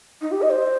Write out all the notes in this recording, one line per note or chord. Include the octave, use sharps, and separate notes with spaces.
D#4
G4
D#5
C5